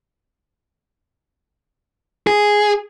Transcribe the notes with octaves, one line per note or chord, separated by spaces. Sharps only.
G#4